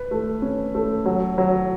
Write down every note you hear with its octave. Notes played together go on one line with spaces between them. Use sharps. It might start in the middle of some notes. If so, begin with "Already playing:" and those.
Already playing: B4
A3
C#4
A3
F#3
F#3